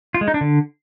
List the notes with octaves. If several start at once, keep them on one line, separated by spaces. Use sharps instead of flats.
F4
G#3
D#4
D4
D3